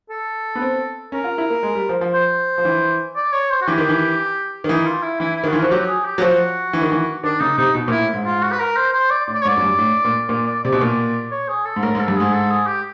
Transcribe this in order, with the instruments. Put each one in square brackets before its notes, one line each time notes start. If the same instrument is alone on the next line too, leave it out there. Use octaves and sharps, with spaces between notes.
[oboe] A4
[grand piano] B3
C4
[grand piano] C#4 [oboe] A#4
[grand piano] F4
E4
A#3
G#3
G3
F3
F3
[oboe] C5
[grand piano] F3
E3
[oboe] D5
C#5
C5
F#4
[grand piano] E3 [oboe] G4
[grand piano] D#3
E3
D#3
[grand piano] E3 [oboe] D#4
[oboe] F4
E4
[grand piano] E3 [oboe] E4
[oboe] E4
[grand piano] D#3
[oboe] F#4
[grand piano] E3 [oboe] F4
[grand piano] F3 [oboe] F#4
[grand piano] F#3 [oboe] G4
[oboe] G#4
G4
[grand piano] F#3
[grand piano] F3 [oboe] F#4
[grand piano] E3
D#3
E3
[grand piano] D#3 [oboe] D4
[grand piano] C#3 [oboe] D#4
[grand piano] C3 [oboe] D#4
[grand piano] B2
A#2
[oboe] E4
[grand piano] A2
G#2
[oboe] F4
F#4
B4
A#4
C5
C5
D5
[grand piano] A2
[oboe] D5
C#5
[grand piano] G#2
[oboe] D5
[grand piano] F#2
G2
A2
A#2
[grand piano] A#2 [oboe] D5
[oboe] D5
[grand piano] C3 [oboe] D5
[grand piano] B2
A#2
[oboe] C#5
G#4
A4
[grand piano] G#2
[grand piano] A2 [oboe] A#4
[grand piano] G#2
[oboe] A4
[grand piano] G2
[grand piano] G#2 [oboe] G#4
[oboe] A4
G#4
G4